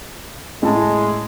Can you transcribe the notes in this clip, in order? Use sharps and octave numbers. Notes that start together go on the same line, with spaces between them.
A2 G#3 A5